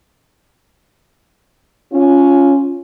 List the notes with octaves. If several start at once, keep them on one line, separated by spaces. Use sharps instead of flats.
C#4 F4